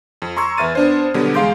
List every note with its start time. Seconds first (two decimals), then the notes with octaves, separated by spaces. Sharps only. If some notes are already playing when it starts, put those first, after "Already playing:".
0.22 F2
0.37 A#5 C6 C#6 E6 G#6
0.57 E2 B4 E5 F6 A6 D#7
0.75 B3 D4 C5
1.14 B2 D3 F#3 G3 B3
1.34 E2 G#3 F5 C6 G6 D7